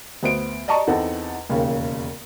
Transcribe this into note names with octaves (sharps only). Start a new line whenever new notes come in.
D2 B3 C5 D7
D5 D#5 A5 A#5 C#6
E2 C4 D#4 A4 F#5
E1 D#2 C#3